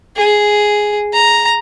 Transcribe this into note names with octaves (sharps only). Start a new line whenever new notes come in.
G#4
A#5